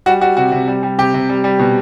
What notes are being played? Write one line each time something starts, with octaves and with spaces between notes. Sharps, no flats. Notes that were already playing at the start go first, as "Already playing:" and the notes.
G3 F#4
G3 F#4
C3 F#4
C3
G3
G3
C3 G4
C3
G3
G3
B2